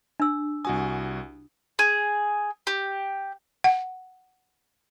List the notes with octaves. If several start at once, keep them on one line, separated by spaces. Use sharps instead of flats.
D4 E6
C2 F#4 G#5 D#6
G#4
G4
F#5